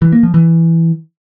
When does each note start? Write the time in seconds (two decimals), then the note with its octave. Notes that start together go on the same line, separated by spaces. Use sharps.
0.02 E3
0.12 A#3
0.23 F3
0.34 E3